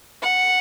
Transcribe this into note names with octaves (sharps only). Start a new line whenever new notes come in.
F#5